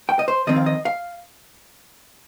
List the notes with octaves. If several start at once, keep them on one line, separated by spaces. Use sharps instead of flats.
G5
D#5
C5
F2 D#3 C4 D#5
F5
D#5
F5